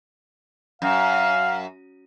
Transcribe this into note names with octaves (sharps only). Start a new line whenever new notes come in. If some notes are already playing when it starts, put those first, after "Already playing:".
F#2 F5